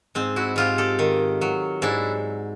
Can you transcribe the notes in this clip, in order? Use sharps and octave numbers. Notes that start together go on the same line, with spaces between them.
G#2 C4
E4 F#4
G#2 F4 G4
G4 A4
D#3
F#3
G#2 D4 E4